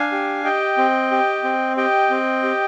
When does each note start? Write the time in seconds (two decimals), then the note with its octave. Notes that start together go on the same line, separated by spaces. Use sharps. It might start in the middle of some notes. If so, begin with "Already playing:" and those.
Already playing: D4 F5 G#5
0.12 G4
0.45 G4 D#5 G5
0.78 C4
1.11 G4
1.44 C4
1.77 G4 D#5 G5
2.11 C4
2.43 G4